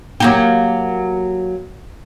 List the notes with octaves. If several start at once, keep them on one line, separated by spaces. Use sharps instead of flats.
F#3 A#3 G4